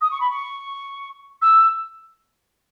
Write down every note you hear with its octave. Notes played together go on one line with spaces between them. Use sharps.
D#6
C#6
B5
C#6
E6